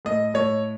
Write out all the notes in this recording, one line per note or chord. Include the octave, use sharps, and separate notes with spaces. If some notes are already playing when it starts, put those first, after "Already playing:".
A2 D#5
A2 C#5